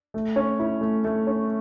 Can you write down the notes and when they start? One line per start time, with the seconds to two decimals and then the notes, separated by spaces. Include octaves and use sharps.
0.14 A3
0.36 C#4
0.60 E4
0.81 A3
1.04 A3
1.27 C#4